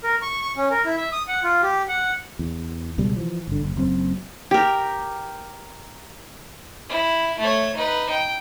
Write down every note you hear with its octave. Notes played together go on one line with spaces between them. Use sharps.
A#4
C#6
C#6
C#4
A#4
E4
E5
D#6
F#5
F4
G4
F#5
E2
C#2 B2 G3 G#3
E3 F3
G1 D3
F#1
F#1 F#2 C4
G4 A#4
E4
A3 C#5
D#4 B4
G5